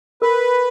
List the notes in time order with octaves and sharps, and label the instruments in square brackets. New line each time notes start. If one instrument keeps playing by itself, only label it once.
[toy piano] A#4 [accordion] B4